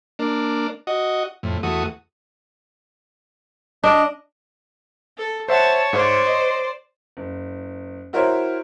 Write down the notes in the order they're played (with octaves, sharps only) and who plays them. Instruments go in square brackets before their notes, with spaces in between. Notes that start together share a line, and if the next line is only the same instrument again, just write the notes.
[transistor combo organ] A#3 D4
F#4 D#5
F2 A2
E2 A3 F#4 D#6
[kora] D4 [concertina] D#5
[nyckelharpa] A4
[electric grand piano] C5 E5 F#5 [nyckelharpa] C#5 C#6 [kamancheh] A5
[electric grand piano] G#2 [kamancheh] C5 D5
[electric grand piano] D#5
[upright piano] F#1
E4 F#4 A#4 C5 C#5 E5